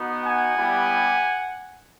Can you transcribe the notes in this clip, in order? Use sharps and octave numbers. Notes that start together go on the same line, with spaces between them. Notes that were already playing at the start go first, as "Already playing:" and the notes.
Already playing: B3 D#4 F#4
F#5 G#5
G3 B3 E4 G4